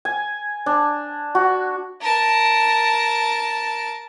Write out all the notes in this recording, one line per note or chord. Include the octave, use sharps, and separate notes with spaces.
G#5
D4
F#4
A#4 A5